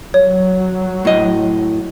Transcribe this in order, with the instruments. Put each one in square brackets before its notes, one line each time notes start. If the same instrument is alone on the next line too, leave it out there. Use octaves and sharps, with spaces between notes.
[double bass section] F#3 [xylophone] C#5
[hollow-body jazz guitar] A2 D#5